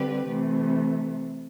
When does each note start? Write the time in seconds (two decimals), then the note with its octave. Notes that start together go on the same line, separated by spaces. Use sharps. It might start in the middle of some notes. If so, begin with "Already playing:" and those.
Already playing: D3 G3 C4 G4 B4
0.26 C3 E3 A3